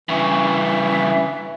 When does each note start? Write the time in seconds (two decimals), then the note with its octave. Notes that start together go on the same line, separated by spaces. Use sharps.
0.09 G2 C#3 E3 E5